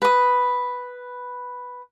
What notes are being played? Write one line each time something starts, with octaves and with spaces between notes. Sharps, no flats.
B4 D#6